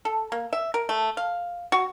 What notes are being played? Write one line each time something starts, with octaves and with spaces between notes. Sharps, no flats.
A4
A#3
E5
A#4
A3
F5
F#4